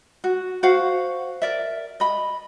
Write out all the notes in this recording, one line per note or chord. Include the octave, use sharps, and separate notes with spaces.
F#4
F#4 C5 F5 F#5
A#4 D5 E5
D#5 B5